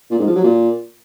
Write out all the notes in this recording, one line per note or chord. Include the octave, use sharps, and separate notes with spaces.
A#2
G#2
F3
F#3
A#2